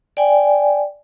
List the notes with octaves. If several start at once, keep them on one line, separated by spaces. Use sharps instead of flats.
D5 G5 G#5